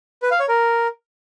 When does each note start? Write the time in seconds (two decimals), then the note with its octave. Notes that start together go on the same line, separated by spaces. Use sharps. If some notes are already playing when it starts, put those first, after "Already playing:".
0.22 B4
0.31 F5
0.40 C#5
0.48 A#4